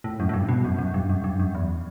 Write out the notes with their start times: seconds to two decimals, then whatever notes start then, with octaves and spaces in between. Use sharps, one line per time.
0.04 A2
0.20 F#2
0.29 A2
0.34 G2
0.49 B2
0.65 F#2
0.79 F#2
0.94 G2
1.09 F#2
1.24 G2
1.39 F#2
1.55 E2